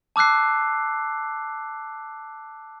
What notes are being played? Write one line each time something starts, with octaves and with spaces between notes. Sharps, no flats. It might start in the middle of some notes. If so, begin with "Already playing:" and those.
A5 D6 E6 F#6 C7